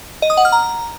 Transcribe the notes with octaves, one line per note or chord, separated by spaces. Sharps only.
D#5
D#6
F#5
F6
A#5